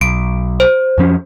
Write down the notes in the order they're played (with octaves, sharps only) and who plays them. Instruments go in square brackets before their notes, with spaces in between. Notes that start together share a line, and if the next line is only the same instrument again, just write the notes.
[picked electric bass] B1 [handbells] D7
[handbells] C5
[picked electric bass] F2 F3 C#4